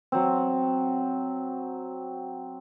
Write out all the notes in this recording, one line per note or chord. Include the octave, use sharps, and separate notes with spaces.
F#3 C4